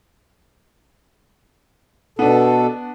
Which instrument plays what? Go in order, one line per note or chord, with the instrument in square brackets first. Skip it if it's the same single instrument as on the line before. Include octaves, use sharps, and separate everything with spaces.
[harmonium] B2 A4 [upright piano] B3 D4